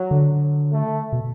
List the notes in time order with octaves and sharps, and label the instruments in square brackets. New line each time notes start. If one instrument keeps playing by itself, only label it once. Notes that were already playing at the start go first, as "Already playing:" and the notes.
Already playing: [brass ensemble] F#3
[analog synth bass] D3
[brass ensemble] A3
[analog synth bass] B2